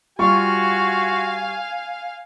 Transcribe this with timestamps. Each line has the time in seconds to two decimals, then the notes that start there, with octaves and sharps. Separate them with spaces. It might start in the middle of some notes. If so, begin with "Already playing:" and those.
0.19 G3 F4 F#4 F5 G#5 C#6